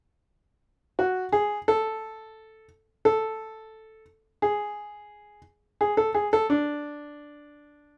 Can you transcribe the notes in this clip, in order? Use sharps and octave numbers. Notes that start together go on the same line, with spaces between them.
F#4
G#4
A4
A4
G#4
G#4
A4
G#4
A4
D4